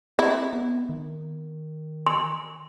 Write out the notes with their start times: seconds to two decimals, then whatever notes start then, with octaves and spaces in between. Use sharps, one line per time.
0.19 C4 E4
0.53 B3
0.89 D#3
2.07 C6